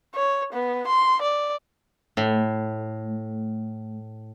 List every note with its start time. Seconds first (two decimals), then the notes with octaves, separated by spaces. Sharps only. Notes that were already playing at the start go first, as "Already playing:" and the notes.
0.15 C#5
0.53 B3
0.87 C6
1.22 D5
2.17 A2 A3